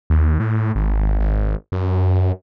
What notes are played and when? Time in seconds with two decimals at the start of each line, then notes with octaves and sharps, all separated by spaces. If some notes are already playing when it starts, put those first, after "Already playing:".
0.10 D#2
0.40 A2
0.75 G#1
1.20 G#1
1.72 F#2